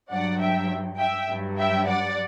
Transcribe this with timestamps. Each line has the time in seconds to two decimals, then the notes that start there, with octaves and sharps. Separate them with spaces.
0.11 G2 F#3 D5 F#5
0.40 E5 G5
0.98 E5 G5
1.28 G2 F#3
1.57 E5 G5
1.87 D5 F#5